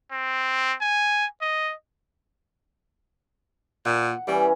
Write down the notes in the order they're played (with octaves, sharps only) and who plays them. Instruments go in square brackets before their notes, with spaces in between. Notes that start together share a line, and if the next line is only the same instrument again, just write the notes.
[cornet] C4
G#5
D#5
[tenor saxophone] A#2 [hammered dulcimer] F#5
[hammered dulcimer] E3 C#4 [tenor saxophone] G3